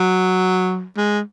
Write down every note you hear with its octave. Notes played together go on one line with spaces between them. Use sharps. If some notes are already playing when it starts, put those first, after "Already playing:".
Already playing: F#3
G#3